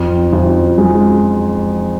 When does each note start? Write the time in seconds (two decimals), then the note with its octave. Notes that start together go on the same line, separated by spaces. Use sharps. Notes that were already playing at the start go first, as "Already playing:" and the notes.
Already playing: F2
0.33 F2
0.78 G#3